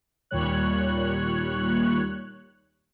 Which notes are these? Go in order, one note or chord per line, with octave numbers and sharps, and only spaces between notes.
D#2 A#2 G3 C#5 F#6